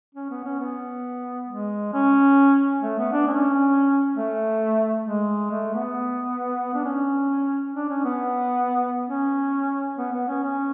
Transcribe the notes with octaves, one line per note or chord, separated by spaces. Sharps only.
C#4
B3
C#4
B3
G#3
C#4
A3
B3
D4
C#4
A3
G#3
A3
B3
D4
C#4
D4
C#4
B3
C#4
B3
B3
C#4
C#4